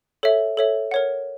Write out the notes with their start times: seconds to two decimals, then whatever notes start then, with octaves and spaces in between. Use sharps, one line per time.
0.23 A4 C#5 E5
0.57 A4 C#5 E5
0.91 A#4 C#5 F#5